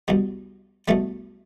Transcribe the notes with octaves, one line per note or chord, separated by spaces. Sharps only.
C2 B2 G3
C2 B2 G3 A3